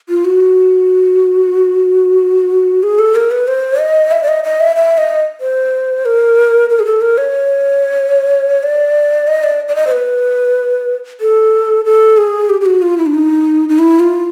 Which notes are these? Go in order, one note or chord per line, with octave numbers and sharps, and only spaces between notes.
F4
F#4
G#4
A4
A#4
B4
C5
D#5
E5
D5
D#5
D#5
E5
E5
D#5
C5
A#4
A#4
G#4
A4
A#4
C#5
D5
D#5
D5
D5
D#5
C5
B4
A4
A4
G#4
G4
G4
F#4
F4
E4
D4
D#4
D#4
E4
F4